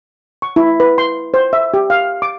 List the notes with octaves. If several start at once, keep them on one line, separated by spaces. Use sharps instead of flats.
C#6
E4
B4
C6
C5
E5
G4
F5
D6